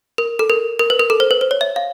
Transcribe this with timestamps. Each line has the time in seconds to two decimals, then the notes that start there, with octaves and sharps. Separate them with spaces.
0.18 A#4
0.39 A4
0.50 A#4
0.79 A#4
0.90 B4
1.00 A#4
1.10 A4
1.20 C5
1.31 B4
1.41 C5
1.51 C#5
1.61 E5
1.76 F5